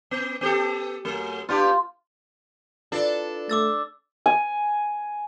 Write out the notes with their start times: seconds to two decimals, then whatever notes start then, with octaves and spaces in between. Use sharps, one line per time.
0.11 B3
0.41 B3 G4 A4
1.05 F#2 A3
1.49 B3 D4 F4 G4
2.92 D4 E4 F4 A4 B4
3.49 A3 D6 E6 A6
4.26 G#5